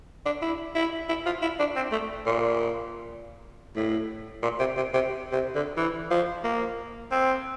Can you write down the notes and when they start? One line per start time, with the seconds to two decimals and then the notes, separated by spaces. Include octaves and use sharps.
0.26 D4
0.42 E4
0.75 E4
1.09 E4
1.26 F4
1.42 E4
1.59 D4
1.76 C4
1.92 A3
2.26 A#2
3.76 A2
4.43 A#2
4.60 C3
4.77 C3
4.94 C3
5.32 C3
5.55 D3
5.77 E3
6.11 F3
6.44 A#3
7.12 C4